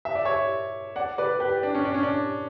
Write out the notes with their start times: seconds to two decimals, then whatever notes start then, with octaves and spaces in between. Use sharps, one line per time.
0.05 E5
0.15 D5
0.25 C#5 E5
0.96 D5 F#5
1.18 B4 D5
1.40 G4 B4
1.63 D4
1.75 C#4
1.85 D4
1.94 C#4
2.03 D4